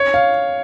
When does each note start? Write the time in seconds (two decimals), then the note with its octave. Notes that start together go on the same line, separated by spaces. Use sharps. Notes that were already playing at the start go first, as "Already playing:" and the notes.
Already playing: C#5
0.14 F5